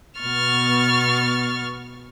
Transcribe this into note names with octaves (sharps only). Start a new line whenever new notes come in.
B2 B3 C#6 F6 A6